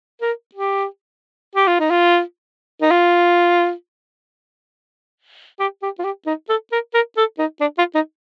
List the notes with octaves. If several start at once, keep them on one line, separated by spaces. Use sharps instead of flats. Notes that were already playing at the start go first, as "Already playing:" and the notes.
A#4
G4
G4
F4
D#4
F4
D#4
F4
G4
G4
F4
G4
D#4
A4
A#4
A#4
A4
D#4
D4
F4
D#4